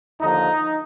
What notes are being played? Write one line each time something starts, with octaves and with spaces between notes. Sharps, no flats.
D#2 D3 F3 A#3 D#4